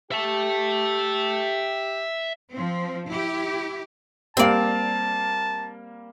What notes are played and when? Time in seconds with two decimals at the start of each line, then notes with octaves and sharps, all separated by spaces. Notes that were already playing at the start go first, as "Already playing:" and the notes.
0.12 G4 E5 A5
2.53 F3 C4
3.08 E4 G4
4.37 G3 A#3 C4 D5 F5 A5